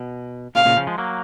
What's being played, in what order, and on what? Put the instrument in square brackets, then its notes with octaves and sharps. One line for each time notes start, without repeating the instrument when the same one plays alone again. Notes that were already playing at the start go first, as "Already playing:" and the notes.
Already playing: [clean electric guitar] B2
[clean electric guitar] A#2 C#3 [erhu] F5
[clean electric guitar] A#2 C#3
C#3 F3
F3 G#3
F#3 A#3